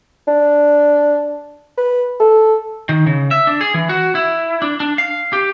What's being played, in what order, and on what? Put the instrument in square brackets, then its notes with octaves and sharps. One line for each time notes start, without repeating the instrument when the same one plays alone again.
[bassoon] D4
B4
A4
[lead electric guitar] D#3
C#3
E5
D4
G#4
E3
F#4
E4
D4
D4
F5
G4